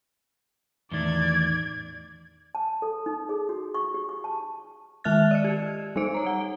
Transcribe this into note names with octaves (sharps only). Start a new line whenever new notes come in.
E2 A2 D#3 D5 G#6
A5
A4
D#4
G#4
F#4
C#6
G4
C#6
A5
D#3 G#3 E5 F6 F#6 A6
D5 D#5 C#7
G4
G3 D#4 C5 D7
C#5 A#5
F#5